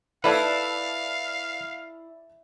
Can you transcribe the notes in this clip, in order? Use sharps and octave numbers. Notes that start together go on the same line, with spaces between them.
E4 A4 B4 D5 F5 A5